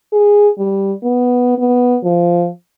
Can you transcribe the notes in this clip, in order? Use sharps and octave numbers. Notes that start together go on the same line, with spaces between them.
G#4
G3
B3
B3
F3